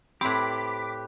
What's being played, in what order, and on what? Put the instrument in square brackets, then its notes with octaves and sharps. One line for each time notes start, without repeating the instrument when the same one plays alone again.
[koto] A2 C4 [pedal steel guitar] G4 B4 [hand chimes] B5 [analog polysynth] D6 B6